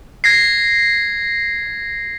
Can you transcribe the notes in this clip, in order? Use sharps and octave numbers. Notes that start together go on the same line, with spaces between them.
G#6 A#6 C7